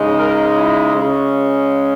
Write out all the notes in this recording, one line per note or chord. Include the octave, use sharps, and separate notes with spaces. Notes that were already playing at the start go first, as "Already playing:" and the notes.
Already playing: C#3 G#3 D#4
A#4
E4
C#3 G#3 C#4